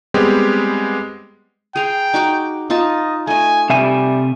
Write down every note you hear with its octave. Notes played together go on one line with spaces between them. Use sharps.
G3 G#3 B3 C4 G4
G#4 G5 A#5 C6
D#4 F#4 D6
D#4 F4 D#5 A5
A3 D#5 G#5
C3 G3 E5 G#5